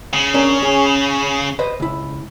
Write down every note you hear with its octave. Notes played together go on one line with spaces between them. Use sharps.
C#3
C#4 D4 A#4
C#4 G#4
B4 C5 D#5
C#2 E4